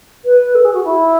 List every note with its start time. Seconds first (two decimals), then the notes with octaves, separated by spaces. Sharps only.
0.25 B4
0.54 A4
0.64 G#4
0.73 F#4
0.84 E4